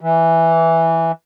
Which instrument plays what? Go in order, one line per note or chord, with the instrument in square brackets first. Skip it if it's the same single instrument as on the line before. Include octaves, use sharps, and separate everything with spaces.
[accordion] E3